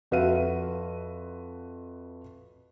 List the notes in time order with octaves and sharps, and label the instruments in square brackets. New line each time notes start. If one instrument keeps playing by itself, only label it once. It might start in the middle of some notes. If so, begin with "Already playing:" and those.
[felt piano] F2 F#4 B4 E5 F5 D#7